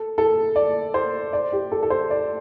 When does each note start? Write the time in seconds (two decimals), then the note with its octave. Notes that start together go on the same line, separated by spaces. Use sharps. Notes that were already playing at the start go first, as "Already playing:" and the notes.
Already playing: A4
0.18 A4
0.56 D5
0.94 C5
1.33 D5
1.52 G4
1.72 A4
1.83 A4
1.90 C5
2.10 D5